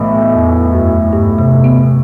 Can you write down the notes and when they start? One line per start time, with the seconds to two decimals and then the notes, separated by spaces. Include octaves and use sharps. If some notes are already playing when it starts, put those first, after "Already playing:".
Already playing: B1 A2 E3
0.35 E2
0.74 F#2
1.13 G2
1.39 C3
1.64 B3